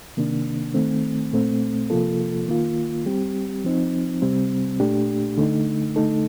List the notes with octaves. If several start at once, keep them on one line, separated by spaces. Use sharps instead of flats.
C3 D#3 A#3 D4
D#3 A3 C4
A#2 A3 C4
C3 F3 A#3 F4 A4
D#3 A#3 F4
G3 C4 G4
F3 C4 D#4
C3 G3 C4
A#2 A3 D4 G4
D3 A3 D#4
D3 A3 D#4 A4